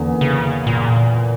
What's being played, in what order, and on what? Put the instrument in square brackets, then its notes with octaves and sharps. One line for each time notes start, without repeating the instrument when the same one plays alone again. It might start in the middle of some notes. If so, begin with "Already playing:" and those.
Already playing: [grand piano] E2 D3 A#3 C#4
[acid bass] C#3
A#2